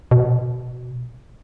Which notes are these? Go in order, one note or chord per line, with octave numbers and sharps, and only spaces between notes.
B2